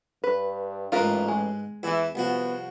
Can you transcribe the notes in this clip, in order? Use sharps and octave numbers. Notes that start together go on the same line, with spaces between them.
G2 B4
A1 G#2 F4 A#4 B4 D#5
G#3
E2 E3 E4
C2 F3 B3 F#4